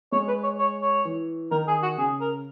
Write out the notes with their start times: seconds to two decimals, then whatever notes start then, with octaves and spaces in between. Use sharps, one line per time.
0.12 G#3 C#5
0.28 B4
0.43 C#5
0.59 C#5
0.82 C#5
1.05 E3
1.51 D#3 A#4
1.68 G#4
1.83 F#4
1.98 C#3 G#4
2.21 A#4